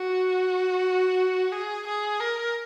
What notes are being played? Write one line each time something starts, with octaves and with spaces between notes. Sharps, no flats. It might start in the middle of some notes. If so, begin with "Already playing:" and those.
Already playing: F#4
G#4
G#4
A#4